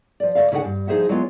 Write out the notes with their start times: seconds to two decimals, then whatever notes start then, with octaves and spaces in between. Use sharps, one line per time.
0.20 F3 D5
0.35 D2 G#3 E5 F5
0.52 C#3 D4 D#4 B4 F#5 G#5
0.64 G2
0.87 F3 D#4 G#4 C5 E5 F#5
1.09 F#3 G#3 A#3 B3 F4